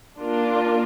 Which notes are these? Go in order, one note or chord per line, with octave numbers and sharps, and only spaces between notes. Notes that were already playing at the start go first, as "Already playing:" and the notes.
A#3 D4 F4 A#4